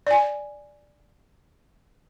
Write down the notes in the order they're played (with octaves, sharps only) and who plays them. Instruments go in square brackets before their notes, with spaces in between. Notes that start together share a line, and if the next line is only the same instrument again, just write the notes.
[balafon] D5 G#5